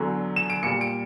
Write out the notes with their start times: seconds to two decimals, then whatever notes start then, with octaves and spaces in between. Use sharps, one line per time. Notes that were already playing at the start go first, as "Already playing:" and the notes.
Already playing: E2 D3 F#3
0.36 E7
0.50 D7
0.63 A#2 C#7
0.66 G3
0.81 D7